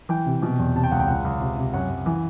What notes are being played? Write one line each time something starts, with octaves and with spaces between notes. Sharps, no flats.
E3 G5
C3
B2
E2
C3 A5
G5
C#2 F#5
G5
C#2 F#5
C#2
C3
C3
F#2 F#5
F#2
E3